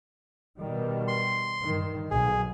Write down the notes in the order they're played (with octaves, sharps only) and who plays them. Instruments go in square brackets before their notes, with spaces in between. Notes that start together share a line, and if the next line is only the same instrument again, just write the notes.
[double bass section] B2 D#3 G3
[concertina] C6
[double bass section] G2 D#3
[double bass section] B1 [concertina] G#4